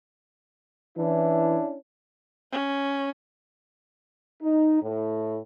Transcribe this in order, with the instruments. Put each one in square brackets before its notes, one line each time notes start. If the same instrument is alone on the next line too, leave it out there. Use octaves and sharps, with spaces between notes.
[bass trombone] E3 [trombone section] C#4 D4 E4
[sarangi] C#4
[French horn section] D#4
A2